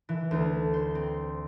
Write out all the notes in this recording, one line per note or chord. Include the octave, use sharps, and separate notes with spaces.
E3
D2
C5
C4